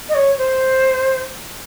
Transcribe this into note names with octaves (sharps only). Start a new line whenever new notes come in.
D#5
C#5
C5